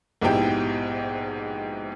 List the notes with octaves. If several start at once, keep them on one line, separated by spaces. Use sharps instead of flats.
A#1 G#2 B2 E4 G4 G5